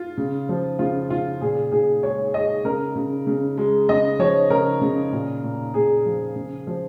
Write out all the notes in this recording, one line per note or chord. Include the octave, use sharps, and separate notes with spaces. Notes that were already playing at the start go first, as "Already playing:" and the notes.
Already playing: F4
C#3
F3
C#3 F4
C#3 F4
A#2 G#4
A#2 G#4
G#3 C#5
G#3 D#5
C#3 A#4
C#3
C#3
G#3
C#3 D#5
F3 C#5
C#3 A#4
C#3
A#2
A#2
A#2 G#4
F3
C#3
F3